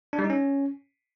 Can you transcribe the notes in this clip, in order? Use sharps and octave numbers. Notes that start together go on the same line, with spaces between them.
D4
G3
D#4
C#4